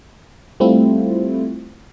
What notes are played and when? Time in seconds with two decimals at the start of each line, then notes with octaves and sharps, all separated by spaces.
0.60 G3 A3 C4 E4 F4